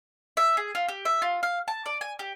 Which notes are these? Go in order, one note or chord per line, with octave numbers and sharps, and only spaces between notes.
E5
G#4
F4
G4
E5
F4
F5
A5
D5
G#5
G4